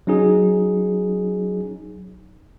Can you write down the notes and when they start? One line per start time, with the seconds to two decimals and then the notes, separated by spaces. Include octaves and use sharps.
0.07 F#3 C#4 D#4 G#4